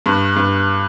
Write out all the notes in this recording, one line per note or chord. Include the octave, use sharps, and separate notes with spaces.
G2
G2